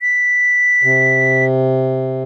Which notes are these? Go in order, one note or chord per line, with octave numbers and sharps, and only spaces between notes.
B6
C3